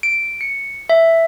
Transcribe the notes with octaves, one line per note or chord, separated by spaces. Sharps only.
D7
C#7
E5